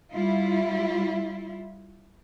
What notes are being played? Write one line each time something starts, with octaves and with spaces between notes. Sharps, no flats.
G3 E4 F4